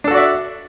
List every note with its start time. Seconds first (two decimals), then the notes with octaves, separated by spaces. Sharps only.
0.04 D4
0.08 A4
0.11 F#4
0.14 D5
0.17 E5